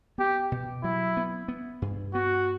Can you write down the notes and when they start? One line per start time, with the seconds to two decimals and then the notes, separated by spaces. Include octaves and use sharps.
0.18 B3 G4
0.52 B2
0.83 F#3 E4
1.17 B3
1.48 B3
1.82 G2
2.14 B3 F#4